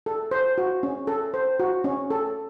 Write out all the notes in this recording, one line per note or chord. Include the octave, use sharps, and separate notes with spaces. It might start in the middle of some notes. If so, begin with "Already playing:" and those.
A4
C5
F#4
C#4
A4
C5
F#4
C#4
A4